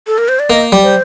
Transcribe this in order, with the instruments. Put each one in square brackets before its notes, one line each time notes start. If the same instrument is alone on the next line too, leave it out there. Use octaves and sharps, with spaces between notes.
[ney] A4
A#4
C5
D5
[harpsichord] A#3 [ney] D#5
[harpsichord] G3
[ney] C5